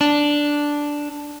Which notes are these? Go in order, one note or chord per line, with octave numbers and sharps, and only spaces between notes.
D4